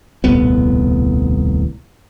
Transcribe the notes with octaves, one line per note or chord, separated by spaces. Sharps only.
D#1 C2 A2 B3